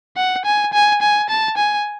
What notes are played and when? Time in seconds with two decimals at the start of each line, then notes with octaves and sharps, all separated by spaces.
0.17 F#5
0.45 G#5
0.73 G#5
1.02 G#5
1.30 A5
1.57 G#5